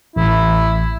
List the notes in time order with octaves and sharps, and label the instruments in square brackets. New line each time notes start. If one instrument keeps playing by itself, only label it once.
[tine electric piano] A1 [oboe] E4